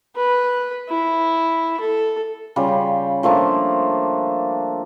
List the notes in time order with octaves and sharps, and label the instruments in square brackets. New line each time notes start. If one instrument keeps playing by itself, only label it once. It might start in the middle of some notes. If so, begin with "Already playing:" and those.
[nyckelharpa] B4
E4
A4
[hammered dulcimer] C#3 G3 F4
F3 A3 A#3 D4